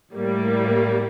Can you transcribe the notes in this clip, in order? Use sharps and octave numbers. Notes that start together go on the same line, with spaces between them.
A2 G3 A#3